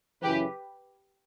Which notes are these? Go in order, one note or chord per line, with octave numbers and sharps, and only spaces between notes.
F#2 C#3 E3 G4 B4